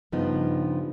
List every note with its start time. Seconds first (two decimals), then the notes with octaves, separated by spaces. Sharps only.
0.12 G2 C#3 F3 B3 D#4